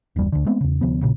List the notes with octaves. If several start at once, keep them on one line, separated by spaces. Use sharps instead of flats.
F#1 D#2 G3
D2 D3
G#3 A3 B3 C4
E2 C#3
D2 C3 F3 B3
A#1 A#2 C#3